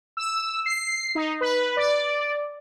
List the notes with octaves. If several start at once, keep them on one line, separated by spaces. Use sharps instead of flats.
E6
C7
D#4
B4
D5